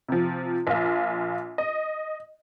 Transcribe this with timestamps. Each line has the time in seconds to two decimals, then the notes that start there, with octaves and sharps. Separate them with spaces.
0.09 C3 F3
0.67 A#1 F4
1.58 D#5